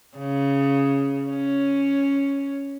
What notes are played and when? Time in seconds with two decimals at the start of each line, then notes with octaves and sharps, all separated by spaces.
0.17 C#3
1.29 C#4